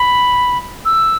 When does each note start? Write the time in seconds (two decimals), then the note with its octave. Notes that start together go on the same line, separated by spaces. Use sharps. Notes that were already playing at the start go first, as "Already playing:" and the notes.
Already playing: B5
0.85 E6